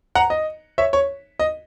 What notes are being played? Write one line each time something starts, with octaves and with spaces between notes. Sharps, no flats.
F#5 A#5
D#5
C#5 E5
C#5
D#5